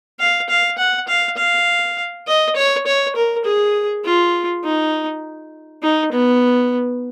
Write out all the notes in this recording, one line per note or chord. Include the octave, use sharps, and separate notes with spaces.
F5
F5
F#5
F5
F5
D#5
C#5
C#5
A#4
G#4
F4
D#4
D#4
B3